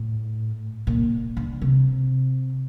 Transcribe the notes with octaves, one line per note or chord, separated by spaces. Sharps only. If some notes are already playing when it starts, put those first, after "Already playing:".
Already playing: A2
A#2
D3
C3